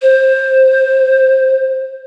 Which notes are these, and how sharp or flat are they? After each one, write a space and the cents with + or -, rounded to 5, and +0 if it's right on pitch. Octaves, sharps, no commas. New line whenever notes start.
C5 +15